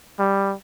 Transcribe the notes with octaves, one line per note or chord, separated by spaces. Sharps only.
G3